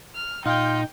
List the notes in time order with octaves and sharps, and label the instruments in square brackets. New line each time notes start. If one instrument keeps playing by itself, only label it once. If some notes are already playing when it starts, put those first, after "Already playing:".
[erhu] F6
[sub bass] A#2 [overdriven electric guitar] D#4 [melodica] F4 F5 [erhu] G5